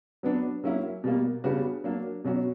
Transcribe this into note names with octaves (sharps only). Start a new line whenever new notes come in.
F#3 B3 D4
F#3 A#3 C#4 E4
B2 G3 A#3
C#3 G3 B3 D4 F#4
F#3 A#3 D4
B2 F#3 C#4 F#4